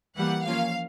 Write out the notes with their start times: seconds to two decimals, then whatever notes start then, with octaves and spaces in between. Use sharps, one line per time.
0.17 E3 G3 A#3 F#5
0.46 F3 A#3 C#4 F4 F5